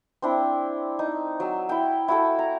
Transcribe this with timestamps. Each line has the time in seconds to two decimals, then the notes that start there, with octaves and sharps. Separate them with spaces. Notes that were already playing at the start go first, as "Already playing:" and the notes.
0.22 C4 D4 E4
0.99 D#4
1.40 F#3 E6
1.69 E4 G5
2.08 E4 F#4 A4
2.39 A#5